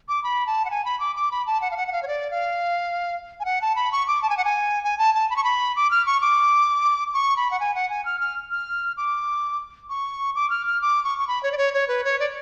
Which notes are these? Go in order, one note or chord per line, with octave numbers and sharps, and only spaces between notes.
D6
B5
A5
F#5
G#5
B5
D6
D6
B5
A5
F#5
F5
F#5
F#5
F5
C#5
D5
F5
G#5
F#5
A5
B5
C#6
D6
A5
G#5
F#5
G#5
G#5
A5
A5
B5
C#6
B5
D6
F6
C#6
D6
C#6
B5
F#5
G#5
F#5
G#5
F6
F6
F6
D6
C#6
D6
F6
F6
D6
C#6
C#6
B5
C#5
D5
C#5
C#5
B4
C#5
D5